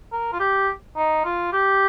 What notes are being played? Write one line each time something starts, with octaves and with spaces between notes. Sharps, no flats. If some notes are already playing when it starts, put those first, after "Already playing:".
A#4
F4
G4
D#4
F4
G4